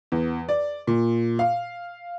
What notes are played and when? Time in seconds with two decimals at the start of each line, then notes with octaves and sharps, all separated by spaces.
0.12 E2
0.49 D5
0.87 A#2
1.39 F5